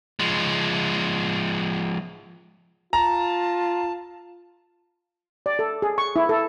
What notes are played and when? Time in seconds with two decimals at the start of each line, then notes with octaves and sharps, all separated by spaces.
0.19 F3 G#3
2.93 F4 A5 A#5
5.46 D5
5.59 A4
5.82 G#4
5.98 C#6
6.16 E4
6.29 A4